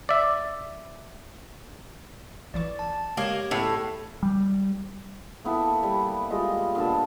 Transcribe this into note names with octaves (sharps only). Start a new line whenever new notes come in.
D5 E5
A1 E3 D5 C#6
A5
G#3 A#3 G4 C#5 G#6 E7
A2 B3 C#4 G#4
G3
A#3 B3 E4 A4
G3
G3 G#3 F4 D#5
A#2 D3 B3 A5